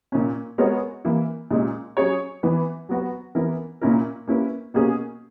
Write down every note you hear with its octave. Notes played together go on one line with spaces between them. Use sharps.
A#2 A#3 C#4
G#3 B3 F#4 A#4 C#5
E3 A#3 E4
A#2 G#3 C#4
F#3 C#4 G#4 C#5
E3 B3 E4 B4
F#3 B3 F#4 B4
E3 B3 E4 A#4
A#2 A#3 C#4 E4 A#4
A#3 C#4 E4 B4
B2 A#3 C#4 G#4